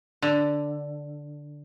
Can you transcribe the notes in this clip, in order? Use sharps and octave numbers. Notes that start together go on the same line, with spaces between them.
D3